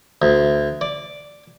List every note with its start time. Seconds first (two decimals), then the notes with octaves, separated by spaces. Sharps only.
0.22 D2
0.81 D5